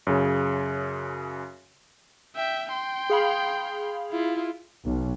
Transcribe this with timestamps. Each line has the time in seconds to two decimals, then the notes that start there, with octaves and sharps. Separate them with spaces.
0.07 F#2 C#3
2.36 E5 G5
2.70 G5 C6
3.10 G#4 F5 B5
4.11 E4 F4
4.84 B1